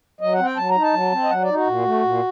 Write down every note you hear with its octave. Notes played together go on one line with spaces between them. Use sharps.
F#3 D#5
F#5
C4
G5
F#3 A5
A#5
D#4
A5
F#3
C4
D#5
F#3 F#5
D5
D#4
F#4
A#2
A3
A#2